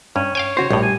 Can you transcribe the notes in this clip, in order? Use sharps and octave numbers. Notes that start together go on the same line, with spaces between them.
G2 C#4
C#5 F5 G5 G#5
C#3 F#4 C5
A#1 A2 G3
G#5